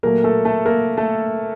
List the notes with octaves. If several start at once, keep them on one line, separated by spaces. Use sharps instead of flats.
A#2 F#3 A3 A#3 A#4
A3 A4
A3 A4
A#3 A#4
A3 A4